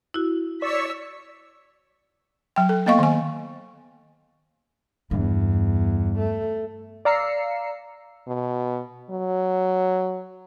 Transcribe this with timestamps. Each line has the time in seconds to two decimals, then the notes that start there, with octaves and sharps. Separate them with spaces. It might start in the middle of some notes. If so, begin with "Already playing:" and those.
0.14 E4 F#4
0.62 C#5 D5 C#6 E6 B6
2.56 F#3 G5
2.69 A4
2.86 A#3 B3 D#5 F5 C#6
2.99 D#3 G#5
5.11 E2 G2
6.19 A3
7.05 D5 F5 A#5 E6 C7 C#7
8.28 B2
9.10 F#3